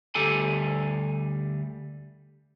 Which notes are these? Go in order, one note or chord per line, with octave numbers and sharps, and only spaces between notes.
D2 G3 G4 A4 G#5